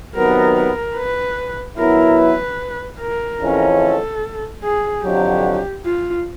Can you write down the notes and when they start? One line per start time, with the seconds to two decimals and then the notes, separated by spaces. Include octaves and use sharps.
0.15 C3 D#3 F#3 B3 A#4
0.56 A#4
0.96 B4
1.78 F#3 B3 E4 A#4
2.18 B4
3.00 A#4
3.41 F2 C#3 E3 A3 C#4
3.81 A4
4.63 G#4
5.04 F2 D3 F#3 G4
5.85 F4